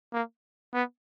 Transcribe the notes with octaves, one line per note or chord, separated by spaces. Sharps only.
A#3
B3